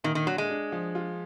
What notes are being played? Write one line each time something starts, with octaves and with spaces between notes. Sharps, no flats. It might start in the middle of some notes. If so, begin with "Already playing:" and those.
A#2 D#3
D#3
F#3 D4
G#3
D4
F3
F4